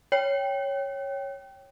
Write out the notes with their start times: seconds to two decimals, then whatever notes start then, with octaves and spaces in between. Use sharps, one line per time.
0.12 C#5 G5